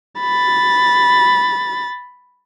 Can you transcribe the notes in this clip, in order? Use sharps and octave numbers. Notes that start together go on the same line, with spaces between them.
B5 A6